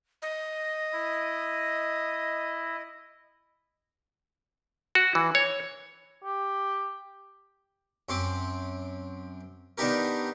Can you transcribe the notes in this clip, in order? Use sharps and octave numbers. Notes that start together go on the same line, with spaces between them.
D#5
E4
F#4
E3
C#5
G4
F#2 C4 C6 D6
D#3 B3 D4 D#4 G4 A#4